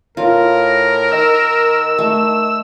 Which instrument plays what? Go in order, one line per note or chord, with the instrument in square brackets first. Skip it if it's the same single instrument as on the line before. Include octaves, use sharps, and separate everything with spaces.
[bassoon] A2 [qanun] F4 [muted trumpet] A#4
[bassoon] D#3 [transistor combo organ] E6
[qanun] A3